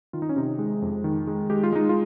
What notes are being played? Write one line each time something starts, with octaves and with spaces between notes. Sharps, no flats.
D#3 F4
D#4
C#4
C3 D#4
G#3
F2
D#3
G#3
G#3 G4
F4
G#3 D#4
F4